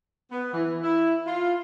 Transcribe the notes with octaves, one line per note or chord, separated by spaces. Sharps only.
B3
E3
E4
F4